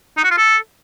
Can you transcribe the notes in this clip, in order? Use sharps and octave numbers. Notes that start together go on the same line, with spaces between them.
D#4
F#4
F4
A4